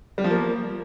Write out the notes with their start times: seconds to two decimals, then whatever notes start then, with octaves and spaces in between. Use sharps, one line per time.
0.18 G3
0.24 F3
0.31 A#3